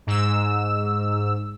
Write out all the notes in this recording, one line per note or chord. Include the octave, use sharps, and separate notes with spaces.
G#2 E6